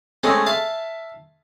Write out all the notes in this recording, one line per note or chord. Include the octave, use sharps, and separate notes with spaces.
G#3 A3 C4 C#4 C#6
E5 F5 A5